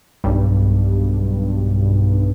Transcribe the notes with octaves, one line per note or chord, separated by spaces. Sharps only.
B1 G2